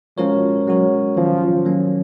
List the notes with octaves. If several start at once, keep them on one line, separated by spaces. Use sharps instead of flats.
F3 G#3 C#4 F#4 A#4 C#5
F#3 G#3 C#4 F#4 A#4 C#5
D#3 F3 F#3 A#3 C#4
D#3 F#3 A#3 C#4